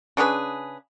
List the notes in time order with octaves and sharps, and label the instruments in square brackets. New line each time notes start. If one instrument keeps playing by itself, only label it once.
[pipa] C#3 D4 G#4 B4